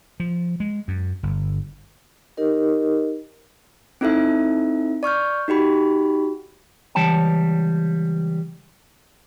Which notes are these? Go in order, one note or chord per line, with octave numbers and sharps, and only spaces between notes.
F3
G#3
F#2
G1
D#4 G4 A#4 D#5
C4 D#4 E4 A4 E5
D5 C#6 F6 G6
D#4 F#4 G4 B5
C#2 E3 G3 C#5 G5 A5